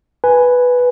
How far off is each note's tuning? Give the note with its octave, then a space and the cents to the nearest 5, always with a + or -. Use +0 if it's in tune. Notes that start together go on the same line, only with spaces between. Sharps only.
B4 +0 G#5 +0